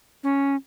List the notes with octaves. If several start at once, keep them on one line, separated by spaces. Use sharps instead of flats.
C#4